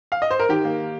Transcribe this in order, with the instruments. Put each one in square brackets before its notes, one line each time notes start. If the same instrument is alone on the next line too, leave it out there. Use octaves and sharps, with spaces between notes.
[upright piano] F5
D#5
C5
A#4
D#3 G4
A#3